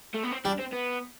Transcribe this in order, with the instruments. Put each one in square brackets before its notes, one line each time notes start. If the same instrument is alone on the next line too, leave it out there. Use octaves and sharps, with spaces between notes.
[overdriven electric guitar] A3
B3
C4
[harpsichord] G3 [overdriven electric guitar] D4
[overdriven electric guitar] C4
B3